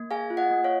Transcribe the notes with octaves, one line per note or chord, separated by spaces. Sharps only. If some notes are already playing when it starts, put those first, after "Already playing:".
Already playing: A#3
G#4 F5 G#5
F4
D#5 F#5
A#3
C#5 F5